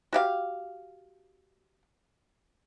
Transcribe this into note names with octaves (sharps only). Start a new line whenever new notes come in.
F#4 G4 F5